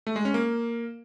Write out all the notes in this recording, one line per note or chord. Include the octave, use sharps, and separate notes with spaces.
A3
G#3
C#4
A#3